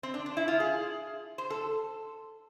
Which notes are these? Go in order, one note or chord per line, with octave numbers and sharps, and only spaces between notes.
C4
D4
D4
E4
F4
G#4
C5
A4